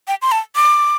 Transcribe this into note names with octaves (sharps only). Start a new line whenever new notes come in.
G5
C6
A5
D6